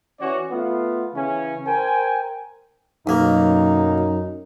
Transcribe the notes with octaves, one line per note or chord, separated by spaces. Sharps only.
E3 C#4 F#4 C#5 D5
A3 B3 F4
C#3 E3 C#4
A#4 C5 G5 G#5
B1 F#2 A#3 D#4